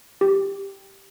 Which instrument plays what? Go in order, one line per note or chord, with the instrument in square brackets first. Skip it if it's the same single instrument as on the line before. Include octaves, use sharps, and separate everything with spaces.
[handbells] G4